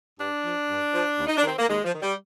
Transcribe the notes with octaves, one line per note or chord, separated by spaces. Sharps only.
G2 D4
F3
G2
F3
D#2
D#4
D4
D#3 C4
A#3
D#2 G#3
F3
D#3
G3